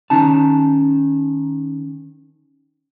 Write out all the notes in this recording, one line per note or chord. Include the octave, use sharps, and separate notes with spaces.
D#3 C#4 D#4 A5